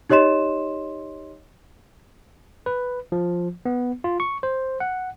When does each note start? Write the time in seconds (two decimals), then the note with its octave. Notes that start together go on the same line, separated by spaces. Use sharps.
0.09 D#4 G4 C#5 D#5 C6 E7
2.66 B4
3.12 F3
3.65 B3
4.04 F4
4.20 C#6
4.43 C5
4.80 F#5